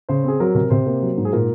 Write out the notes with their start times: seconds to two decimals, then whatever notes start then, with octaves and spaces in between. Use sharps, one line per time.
0.09 C#3 C5
0.24 C4 G#4
0.40 F#3 A#4
0.55 C3 A#4
0.70 C3 C5
0.86 A#3
1.02 F#3
1.18 G#2
1.25 G#4
1.32 A#2 A#4